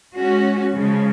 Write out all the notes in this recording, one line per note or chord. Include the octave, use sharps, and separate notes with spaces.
G#3 C#4 F#4
C#3 F3 G#3